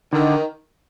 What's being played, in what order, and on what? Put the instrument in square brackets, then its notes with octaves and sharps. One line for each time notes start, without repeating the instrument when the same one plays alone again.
[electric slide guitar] D3 [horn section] D#3